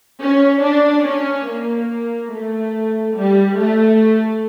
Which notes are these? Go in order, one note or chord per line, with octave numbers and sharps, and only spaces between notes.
C#4
D4
C#4
A#3
A3
G3
A3